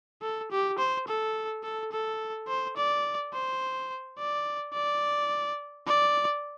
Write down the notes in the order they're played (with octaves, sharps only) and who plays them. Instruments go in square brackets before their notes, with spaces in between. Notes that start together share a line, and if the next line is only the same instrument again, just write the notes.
[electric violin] A4
G4
C5
A4
A4
A4
C5
D5
C5
D5
D5
D5